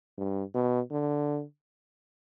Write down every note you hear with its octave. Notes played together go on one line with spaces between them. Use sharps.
G2
B2
D3